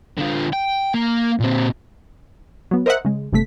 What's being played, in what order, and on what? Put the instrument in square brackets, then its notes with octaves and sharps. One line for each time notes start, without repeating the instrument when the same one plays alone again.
[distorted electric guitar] D3 F4
G5
A#3
A#2 C4
[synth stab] F#3 B3
A#4 C5 D#5 E5 F#5
C#3 G#3
G1 C3 A3 B6